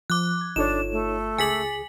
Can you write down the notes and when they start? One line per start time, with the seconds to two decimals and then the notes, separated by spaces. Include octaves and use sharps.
0.10 F3 D6 F#6
0.41 G#6
0.56 G1 D4 D#4 F4 A4 C#5 E7
0.92 A3
1.38 C#2 G#4 G#5 D6 A6 B6 F#7